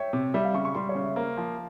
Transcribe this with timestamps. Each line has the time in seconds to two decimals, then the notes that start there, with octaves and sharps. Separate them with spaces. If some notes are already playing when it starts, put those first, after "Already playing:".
Already playing: C#5 E5 G5
0.13 C3
0.34 G3 E5
0.45 F5
0.54 C#3 C#6
0.65 C#6
0.75 G3 C6
0.89 C#5
0.95 C#3
1.03 E5
1.16 A#3 C5
1.37 F3